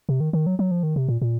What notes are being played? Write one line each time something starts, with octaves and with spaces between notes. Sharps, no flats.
C3
D#3
D#3
F#3
F#3
F3
D#3
C3
A#2
A#2